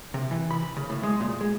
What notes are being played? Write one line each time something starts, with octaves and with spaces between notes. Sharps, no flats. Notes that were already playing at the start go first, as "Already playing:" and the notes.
C3
E3
B5
C#3
A2
G#3
A#2
G#3